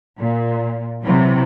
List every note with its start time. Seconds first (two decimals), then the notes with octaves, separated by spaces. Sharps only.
0.20 A#2
1.02 C3 E3 F#3